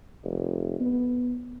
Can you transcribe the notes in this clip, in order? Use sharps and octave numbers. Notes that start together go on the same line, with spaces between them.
F1
B3